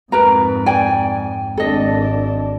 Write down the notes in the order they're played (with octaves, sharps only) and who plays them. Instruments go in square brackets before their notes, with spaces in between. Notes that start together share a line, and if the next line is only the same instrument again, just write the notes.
[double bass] F2 G#2 [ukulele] A#4 B4 A#5
[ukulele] D5 G5 G#5
[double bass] G#1 D4 [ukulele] A4 D#5